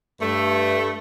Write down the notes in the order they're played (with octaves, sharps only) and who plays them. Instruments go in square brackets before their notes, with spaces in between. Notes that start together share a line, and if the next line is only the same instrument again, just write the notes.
[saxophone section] G2 A3